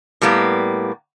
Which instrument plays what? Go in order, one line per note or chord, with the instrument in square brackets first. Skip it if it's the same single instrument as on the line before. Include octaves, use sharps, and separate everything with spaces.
[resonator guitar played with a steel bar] A2 G3 A#3 B3